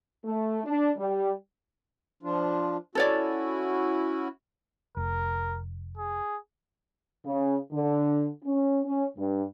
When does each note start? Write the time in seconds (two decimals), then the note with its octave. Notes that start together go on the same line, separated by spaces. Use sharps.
0.24 A3
0.64 D4
0.97 G3
2.23 F3 D4 F4
2.95 C#4 E4 F#4 A4 C#5 D5
4.97 F1 A#4
5.97 G#4
7.25 C#3
7.72 D3
8.45 C#4
8.85 C#4
9.17 G2